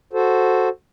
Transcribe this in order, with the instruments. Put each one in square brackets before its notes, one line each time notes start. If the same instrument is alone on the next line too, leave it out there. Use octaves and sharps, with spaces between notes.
[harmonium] F#4 A4 C5